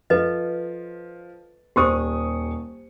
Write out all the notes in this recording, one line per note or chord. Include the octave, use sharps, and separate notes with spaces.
F3 A4 B4 D#5
D#1 G4 C5 C#6 D#6